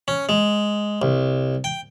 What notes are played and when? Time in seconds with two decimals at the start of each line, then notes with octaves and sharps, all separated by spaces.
0.08 C#4
0.29 G#3
1.02 C2
1.64 G5